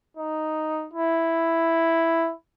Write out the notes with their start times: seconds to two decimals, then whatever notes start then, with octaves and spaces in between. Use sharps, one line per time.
0.17 D#4
0.93 E4